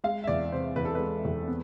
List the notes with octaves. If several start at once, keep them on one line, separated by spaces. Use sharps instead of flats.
G#3 F5
E5
E2 D5
C3 C5
E2 B4
A4
G#3 B4
E2
B3